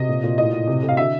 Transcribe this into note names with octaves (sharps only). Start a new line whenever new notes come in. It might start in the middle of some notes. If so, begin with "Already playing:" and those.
Already playing: C3 D#5
A#2
A#2
A2 D#5
A2
C3
C3
F5
D3 E5